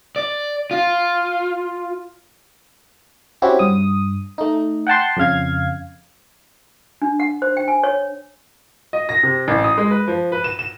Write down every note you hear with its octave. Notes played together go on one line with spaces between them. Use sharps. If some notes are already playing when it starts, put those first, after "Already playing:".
D5
F4
C4 C#4 E4 F#4 G4
G2 D#6
A3 D#4
F#5 G5 A5 C6
F2 C#3 F5 G#6
D4
F#5
C5
G5
G#5
C#5
D#5
A#6
C3
A1
D#6
G#3
B4
F3
B4
E7
E7